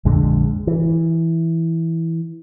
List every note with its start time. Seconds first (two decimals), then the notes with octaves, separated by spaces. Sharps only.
0.05 A#1 F2 D3 G#3
0.67 E3